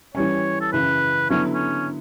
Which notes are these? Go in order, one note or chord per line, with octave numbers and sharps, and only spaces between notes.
E3 G3 C#4 C#5
A4
F#2 C#3 E3 B4
D3 F#3 B3 C#4 E4
C#4